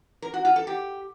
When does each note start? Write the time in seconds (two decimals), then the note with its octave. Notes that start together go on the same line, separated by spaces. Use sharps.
0.22 A#4
0.34 F#4
0.45 F4
0.56 A4
0.67 G4